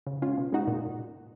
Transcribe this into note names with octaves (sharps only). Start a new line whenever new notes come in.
C#3
G#3 C#4 F4
B2
G#3 D#4 F#4
A#2